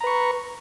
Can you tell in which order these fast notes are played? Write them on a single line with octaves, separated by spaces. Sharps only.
A#5 B4 C#6